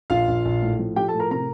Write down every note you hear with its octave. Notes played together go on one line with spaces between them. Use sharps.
A#1 F4 F5
A#1
A#1
A2
F3
F3 G4 G5
A4 A5
A2
A#4 A#5
C3 A#4 A#5